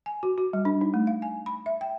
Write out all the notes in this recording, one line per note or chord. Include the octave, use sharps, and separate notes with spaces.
G#5
F#4
F#4
G3
D4
D#4
A3
F5
G#5
B5
E5
G5